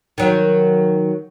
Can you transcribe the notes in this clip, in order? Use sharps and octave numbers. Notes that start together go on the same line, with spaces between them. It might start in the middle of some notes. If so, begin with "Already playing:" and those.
D#3 F#3